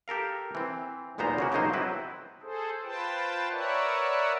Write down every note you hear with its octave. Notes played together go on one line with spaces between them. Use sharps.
G4 A4 A#4 F5
E3 C4
B1 E2 A#2 B3 C5 A#5
C#3 A#3 F#4
B1 F3 F#3 A#3 D#4 C5
F#3 C4 E4 B4 C5
G#4 A4 C5
F4 B4 C5 G5 A5
A#4 B4 C#5 D5 E5 F#5